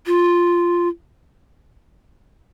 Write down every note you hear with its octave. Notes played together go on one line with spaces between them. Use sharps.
F4